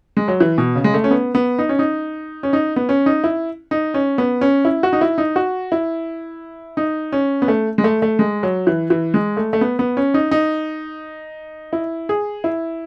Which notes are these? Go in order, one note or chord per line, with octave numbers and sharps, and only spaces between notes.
G#3
F#3
E3
B2
C#3
G#3
A3
C#4
B3
B3
D#4
C#4
D#4
C#4
D#4
B3
C#4
D#4
E4
D#4
C#4
B3
C#4
E4
F#4
D#4
E4
D#4
F#4
E4
D#4
C#4
B3
A3
G#3
A3
A3
G#3
F#3
E3
E3
G#3
A3
A3
B3
B3
C#4
D#4
D#4
E4
G#4
E4